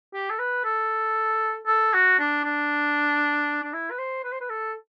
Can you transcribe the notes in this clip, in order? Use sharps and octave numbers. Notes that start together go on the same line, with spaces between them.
G4
A4
B4
A4
A4
F#4
D4
D4
D4
E4
B4
C5
B4
C5
B4
A4